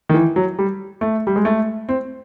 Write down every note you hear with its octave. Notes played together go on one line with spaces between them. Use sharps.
D#3
E3
F#3
G3
A3
G3
G#3
A3
C4